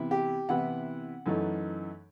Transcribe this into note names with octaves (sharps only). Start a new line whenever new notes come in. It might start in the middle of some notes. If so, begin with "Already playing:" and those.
Already playing: C3 E3 B3 E4
G4
C3 E3 B3 E4 F#5
F#2 E3 A3 D#4